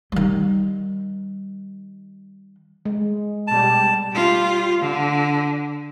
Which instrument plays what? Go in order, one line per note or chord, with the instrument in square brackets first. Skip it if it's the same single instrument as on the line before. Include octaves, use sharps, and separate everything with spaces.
[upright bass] D#3 G3
[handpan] G#3
[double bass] B2 G3 [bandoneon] A5
[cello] G3 F4
D3